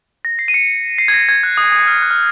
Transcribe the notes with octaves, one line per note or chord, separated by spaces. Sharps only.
A#6
C7
D#7
C#7
C7
G#6
A#6
G#6
F#6
D#6
D#6
F6
F#6
F6